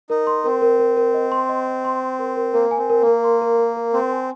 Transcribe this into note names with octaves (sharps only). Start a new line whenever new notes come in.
D#4 A#4
C6
C4 A#4
A#4
A#4
A#4
D#5
C6
D#5
D#5
C6
C6
A#4
A#4
A#3 A#4
G#5
C4
A#4
A#3
A#4
C6
A#4
A#4
A#4
C4 C6
G#5